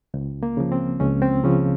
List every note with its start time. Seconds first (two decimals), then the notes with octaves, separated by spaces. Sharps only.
0.14 C#2
0.43 A#3
0.57 C#3 F3
0.72 C4
1.00 C#2 C#4
1.22 C4
1.44 C#3 F3 C#4